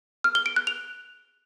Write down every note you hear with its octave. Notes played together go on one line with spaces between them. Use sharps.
F6
G7
D7
F#6
F7